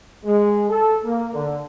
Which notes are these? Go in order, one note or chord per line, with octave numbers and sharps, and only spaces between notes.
G#3
A4
A#3
D3